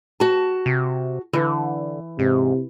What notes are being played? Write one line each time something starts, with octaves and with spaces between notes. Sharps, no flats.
F#4 A5
C3
D3 E3
G#2 C3